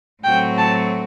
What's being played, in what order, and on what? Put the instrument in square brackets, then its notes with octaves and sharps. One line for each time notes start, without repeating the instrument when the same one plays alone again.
[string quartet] A2 F#3 A3 C4 F#4 [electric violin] G5
[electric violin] A5